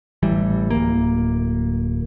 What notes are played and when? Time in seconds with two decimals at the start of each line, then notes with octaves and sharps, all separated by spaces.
0.23 A1 E3 G3
0.71 D1 A#3